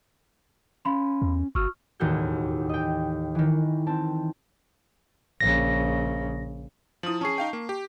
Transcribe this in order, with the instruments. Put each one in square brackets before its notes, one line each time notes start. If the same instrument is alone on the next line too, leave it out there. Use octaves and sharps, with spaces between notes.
[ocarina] C#4 [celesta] F5 B5 C6
[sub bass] E2
[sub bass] G1 [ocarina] F#4 [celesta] C#6 E6 F6
[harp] E1 D#2 A2 F#4 G6
D#5 G5
D#3 E3
C4 A5
[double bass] A#1 C#3 [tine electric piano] A#6
[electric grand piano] F3 D#6 [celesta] E4 F#7
[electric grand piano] C#4 G#4 [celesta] A5 C#6 C7
[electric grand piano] D#4 F5 G5
A#3
G4